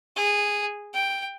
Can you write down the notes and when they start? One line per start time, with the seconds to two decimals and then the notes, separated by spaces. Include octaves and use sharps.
0.16 G#4
0.94 G5